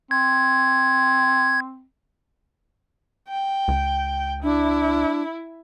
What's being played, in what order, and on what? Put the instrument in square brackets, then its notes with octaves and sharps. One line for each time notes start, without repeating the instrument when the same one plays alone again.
[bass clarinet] C4 [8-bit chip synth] G#6
[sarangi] G5
[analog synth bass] C#2
[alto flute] D4 [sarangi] E4